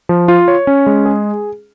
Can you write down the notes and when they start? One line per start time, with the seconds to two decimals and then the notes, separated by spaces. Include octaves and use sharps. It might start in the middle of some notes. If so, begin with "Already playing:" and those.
0.09 F3
0.28 F4
0.48 C#5
0.67 C#4
0.86 G#3
1.06 G#4